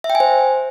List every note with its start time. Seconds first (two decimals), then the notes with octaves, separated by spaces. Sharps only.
0.04 E5
0.10 G5
0.15 G#5
0.20 C5